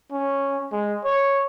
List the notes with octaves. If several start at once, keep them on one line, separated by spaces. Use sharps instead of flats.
C#4
G#3
C#5